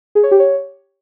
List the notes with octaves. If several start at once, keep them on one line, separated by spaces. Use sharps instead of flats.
G#4
C#5
G4
C#5